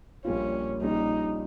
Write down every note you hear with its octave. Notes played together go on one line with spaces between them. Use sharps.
A#1 A#2 G3 A#3 C#4 F4
A#1 A#2 G3 C#4 D#4